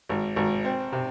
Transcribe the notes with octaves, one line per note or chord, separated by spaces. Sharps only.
G#1
G#1
C4
C3